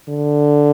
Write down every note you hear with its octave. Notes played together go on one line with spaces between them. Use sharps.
D3